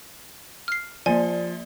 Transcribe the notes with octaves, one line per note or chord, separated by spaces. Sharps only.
F6 C7
F3 A#3 D5 G#5